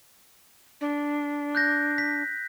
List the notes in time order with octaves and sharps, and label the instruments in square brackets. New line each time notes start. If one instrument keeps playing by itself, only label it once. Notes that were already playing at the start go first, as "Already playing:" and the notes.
[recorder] D4
[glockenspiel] F#6 G6 A#6
B6